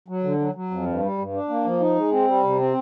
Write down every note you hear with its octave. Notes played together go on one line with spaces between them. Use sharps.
F#3
D3
F#3
F#3
F2
G2
G3
G2
D4
A#3
F3
D#4
G#3
C4
G3
C3
C4